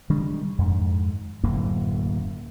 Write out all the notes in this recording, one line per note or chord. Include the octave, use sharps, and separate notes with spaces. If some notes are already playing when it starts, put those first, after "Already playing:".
D#3 G3 G#3 D4
F2 G#2
D1 F#2 A2 A#3